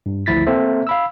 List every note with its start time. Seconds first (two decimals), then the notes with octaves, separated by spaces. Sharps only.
0.06 G2
0.26 G#1 D2 F3 E4 A6 B6
0.47 A#3 C4 A4 C5 E5
0.87 F5 B5 E6